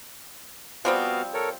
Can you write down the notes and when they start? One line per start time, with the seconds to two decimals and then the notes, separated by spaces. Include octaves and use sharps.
0.85 F3 G3 B3 C4 F#4 F5
1.34 A4 A#4 C#5